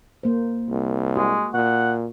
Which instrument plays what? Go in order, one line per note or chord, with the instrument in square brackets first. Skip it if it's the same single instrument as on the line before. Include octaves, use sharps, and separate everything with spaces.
[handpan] A#3 C5
[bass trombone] C2
[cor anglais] G#3 [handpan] F#4
[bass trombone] A#2 [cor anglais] F#5